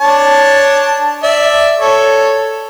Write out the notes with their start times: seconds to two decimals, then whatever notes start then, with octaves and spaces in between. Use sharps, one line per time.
0.01 D4 C#5 A5
1.23 D5 E5
1.80 A4 C#5